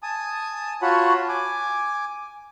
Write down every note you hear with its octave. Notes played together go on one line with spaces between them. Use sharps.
G#5 A5 D#6
F4 F#4 C#5 F#5 A5 B5
G#5 D6